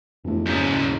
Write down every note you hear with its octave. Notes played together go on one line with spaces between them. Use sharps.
E1 F2 A3
F#1 G#2 C#3
D#1